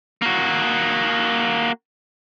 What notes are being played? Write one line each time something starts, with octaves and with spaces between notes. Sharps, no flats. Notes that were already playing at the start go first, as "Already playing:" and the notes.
A#3 F#4